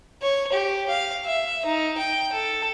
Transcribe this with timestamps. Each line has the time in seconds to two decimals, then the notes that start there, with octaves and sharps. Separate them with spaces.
0.22 C#5
0.52 G4
0.89 F5
1.26 E5
1.65 D#4
1.98 G5
2.32 A4